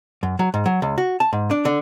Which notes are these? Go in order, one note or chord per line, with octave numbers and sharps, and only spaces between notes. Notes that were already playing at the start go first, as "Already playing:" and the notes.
F#2
F#3
G#2
F#3
C#2
F#4
A5
G#2
D4
D3